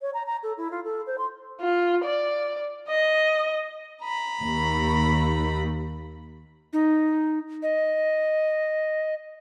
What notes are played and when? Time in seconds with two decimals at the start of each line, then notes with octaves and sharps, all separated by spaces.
0.02 C#5
0.14 A#5
0.26 A#5
0.43 A4
0.57 E4
0.71 F4
0.85 A4
1.07 C5
1.18 C6
1.61 F4
2.04 D5
2.88 D#5
4.03 A#5 B5
4.42 D#2
6.73 D#4
7.63 D#5